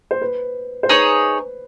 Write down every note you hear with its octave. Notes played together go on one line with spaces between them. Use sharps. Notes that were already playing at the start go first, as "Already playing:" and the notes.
C5
B4
C5
D#4 G#4 B4 C#5